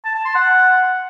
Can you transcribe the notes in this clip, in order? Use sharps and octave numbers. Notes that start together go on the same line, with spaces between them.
A5
A5
C6
F#5